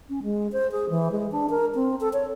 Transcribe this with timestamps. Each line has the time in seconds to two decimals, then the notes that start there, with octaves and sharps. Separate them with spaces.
0.09 C#4
0.23 G#3
0.52 C5
0.72 G#4
0.90 E3
1.12 G#3
1.32 D4
1.50 A#4
1.75 C4
2.01 A4
2.13 C#5